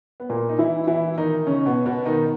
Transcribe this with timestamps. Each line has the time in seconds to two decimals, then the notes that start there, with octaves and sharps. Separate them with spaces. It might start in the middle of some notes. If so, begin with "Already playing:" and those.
0.20 B3
0.30 A#2 A#3
0.49 D#4
0.58 E3 E4
0.87 E3 E4
1.17 D#3 D#4
1.47 C#3 C#4
1.66 B2 B3
1.86 B2 B3
2.05 D#3 D#4